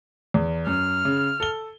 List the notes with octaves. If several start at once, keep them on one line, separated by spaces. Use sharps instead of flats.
E2
F#2 F6
C#3
A4 G7